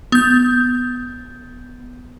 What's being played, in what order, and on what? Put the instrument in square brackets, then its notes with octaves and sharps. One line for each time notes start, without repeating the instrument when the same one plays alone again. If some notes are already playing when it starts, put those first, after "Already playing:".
[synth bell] B3 G6